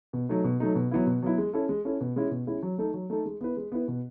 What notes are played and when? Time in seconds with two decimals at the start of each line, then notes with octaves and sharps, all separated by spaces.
0.13 B2
0.29 F#3 A3 D#4
0.44 B2
0.60 F#3 A3 D#4
0.75 B2
0.91 F#3 B3 E4
1.07 B2
1.22 F#3 B3 E4
1.38 G#3
1.53 C#4 E4 A4
1.69 G#3
1.85 C#4 E4 A4
2.01 B2
2.16 G#3 C#4 E4
2.31 B2
2.47 G#3 C#4 E4
2.63 F#3
2.78 A3 D#4 A4
2.94 F#3
3.10 A3 D#4 A4
3.26 G#3
3.41 B3 E4 B4
3.57 G#3
3.72 B3 E4 B4
3.88 B2